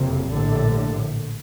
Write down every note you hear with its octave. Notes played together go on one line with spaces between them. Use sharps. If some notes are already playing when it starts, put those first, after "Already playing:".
Already playing: F#1 F2 C3
A#1 A2 D3